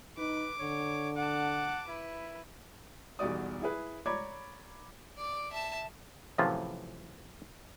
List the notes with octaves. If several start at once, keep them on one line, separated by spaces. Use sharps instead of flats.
D#4 B4 D6
D3 C#5
F#5 A5 D6
E4 B4
B1 E2 G3 F#4 D5 D#6
E4 G#4 B4
C#5 D5 A#5 B5 D6 G#6
D5 D6
E5 A5
F#2 A2 C3 E3 F3 F4